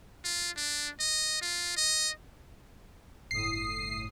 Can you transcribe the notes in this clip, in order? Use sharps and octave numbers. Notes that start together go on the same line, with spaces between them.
F4
D4
D#5
F4
D#5
G1 A2 D#6 C7